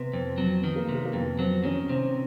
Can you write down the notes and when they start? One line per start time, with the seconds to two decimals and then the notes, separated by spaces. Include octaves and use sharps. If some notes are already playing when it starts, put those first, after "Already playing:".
Already playing: C3 B3
0.13 F2 C4
0.38 F#3 C4
0.57 B3
0.64 D#3
0.76 A#3
0.89 C3
0.95 A#3
1.05 A#3
1.13 F2 B3
1.39 F#3 C4
1.64 D#3 C#4
1.89 C3 C4